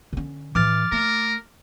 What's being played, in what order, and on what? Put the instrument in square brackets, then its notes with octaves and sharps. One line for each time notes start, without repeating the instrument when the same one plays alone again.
[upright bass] D3 C#4
[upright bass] A2 E3 [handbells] D6 F6 A6
[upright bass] A3 [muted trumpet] A#4